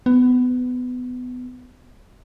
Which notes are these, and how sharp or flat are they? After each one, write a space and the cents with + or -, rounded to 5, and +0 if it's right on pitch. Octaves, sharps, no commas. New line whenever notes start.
B3 +20